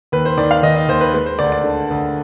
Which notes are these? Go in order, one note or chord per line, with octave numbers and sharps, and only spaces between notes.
D#2 B4
C5
D#3 D5
F5
D#3 D#5
D#5
D#2 C5
B4
G#3 B4
C5
D2 D5
D5
D3
D2